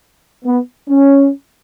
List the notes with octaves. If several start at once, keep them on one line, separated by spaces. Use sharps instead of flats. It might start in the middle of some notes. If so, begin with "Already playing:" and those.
B3
C#4